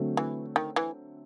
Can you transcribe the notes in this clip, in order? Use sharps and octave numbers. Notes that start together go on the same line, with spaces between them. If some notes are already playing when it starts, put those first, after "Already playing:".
Already playing: D3 F#3 A3 C4
E3
D#3
E3